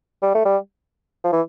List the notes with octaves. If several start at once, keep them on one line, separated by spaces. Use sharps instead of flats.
G3
A3
G3
F3
E3